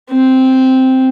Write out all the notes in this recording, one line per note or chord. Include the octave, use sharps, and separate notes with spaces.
C4